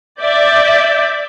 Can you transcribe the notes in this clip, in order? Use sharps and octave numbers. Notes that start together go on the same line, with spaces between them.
D5 E5 G6